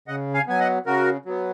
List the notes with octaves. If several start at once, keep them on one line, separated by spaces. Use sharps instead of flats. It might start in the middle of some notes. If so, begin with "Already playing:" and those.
C#3 D#5 F#5
F5 G#5
F#3 B3 G#5
D#5 F#5
C#3 F#4 A#4
F#3 B3